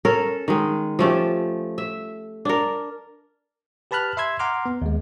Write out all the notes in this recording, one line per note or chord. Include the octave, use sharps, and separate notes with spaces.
C#4 A4 A#4
D#3 G#3
F3 A3 C#4 G4
E5
D4 A#4
G4 B4 A5 B5 F6 F#6
E5 B5 C6 E6 G#6
F#5 A#5 C6 D6 F6
B3
D#2 G#3